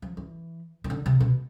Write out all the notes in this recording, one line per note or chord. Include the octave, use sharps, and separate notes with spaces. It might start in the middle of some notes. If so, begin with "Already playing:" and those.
F3
E3
D#3
D3
C3
B2